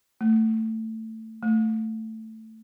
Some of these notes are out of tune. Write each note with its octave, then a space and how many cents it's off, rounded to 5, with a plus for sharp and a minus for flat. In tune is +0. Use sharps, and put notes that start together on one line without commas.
A3 +15
A3 +10